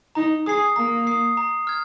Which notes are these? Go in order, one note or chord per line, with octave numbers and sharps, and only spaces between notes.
D#4 A#5
G#4 D#6 C7
A#3 A#5
D#6 C7
A#5
F6 G#6